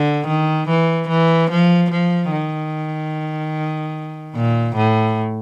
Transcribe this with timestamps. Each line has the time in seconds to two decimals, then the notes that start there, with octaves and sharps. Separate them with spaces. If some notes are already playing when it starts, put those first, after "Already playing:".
Already playing: D3
0.27 D#3
0.69 E3
1.09 E3
1.51 F3
1.91 F3
2.32 D#3
4.35 A#2
4.76 A2